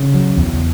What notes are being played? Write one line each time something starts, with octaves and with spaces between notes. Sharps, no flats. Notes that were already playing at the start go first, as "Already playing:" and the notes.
Already playing: C#3
F#3
E2